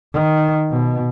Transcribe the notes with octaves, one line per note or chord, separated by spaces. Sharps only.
D#3
B2